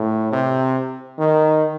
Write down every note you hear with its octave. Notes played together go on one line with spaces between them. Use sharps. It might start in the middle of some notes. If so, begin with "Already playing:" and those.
Already playing: A2
C3
D#3